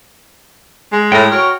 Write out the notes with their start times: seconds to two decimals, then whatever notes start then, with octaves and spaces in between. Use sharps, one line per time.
0.92 G#3
1.12 A2 G5 A#5
1.32 F#4 A#4 C#5